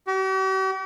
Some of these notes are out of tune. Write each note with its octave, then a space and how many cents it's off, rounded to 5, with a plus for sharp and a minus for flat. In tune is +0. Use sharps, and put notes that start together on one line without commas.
G4 -45